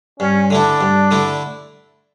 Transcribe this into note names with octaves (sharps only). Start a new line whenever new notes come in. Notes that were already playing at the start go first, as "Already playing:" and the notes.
G2 C#4
D3 A3 D4 E4
G2
D3 A3 E4